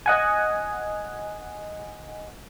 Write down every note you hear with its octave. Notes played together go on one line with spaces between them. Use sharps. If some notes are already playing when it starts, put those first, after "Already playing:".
D#5 F#5 G#5